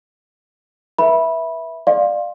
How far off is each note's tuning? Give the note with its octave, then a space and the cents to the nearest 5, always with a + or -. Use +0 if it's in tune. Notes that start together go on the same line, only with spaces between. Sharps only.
B4 -35 E5 -5 B5 -15
D5 +25 F5 +0 C6 +20